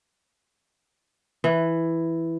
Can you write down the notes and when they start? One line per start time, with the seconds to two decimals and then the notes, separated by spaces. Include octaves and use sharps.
1.44 E3